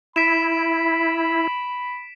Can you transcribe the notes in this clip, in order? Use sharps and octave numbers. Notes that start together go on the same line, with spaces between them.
E4 B5 B6 D7 E7